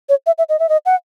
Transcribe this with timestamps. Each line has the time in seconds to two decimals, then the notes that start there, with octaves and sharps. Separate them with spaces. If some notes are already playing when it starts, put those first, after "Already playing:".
0.09 C#5
0.26 E5
0.38 E5
0.49 D#5
0.59 E5
0.69 D#5
0.86 F#5